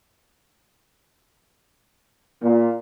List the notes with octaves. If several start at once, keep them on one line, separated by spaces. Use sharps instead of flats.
A#2